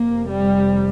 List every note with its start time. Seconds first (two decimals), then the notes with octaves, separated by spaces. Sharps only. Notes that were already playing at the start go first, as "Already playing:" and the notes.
Already playing: F1 F2 C3 A#3
0.28 G3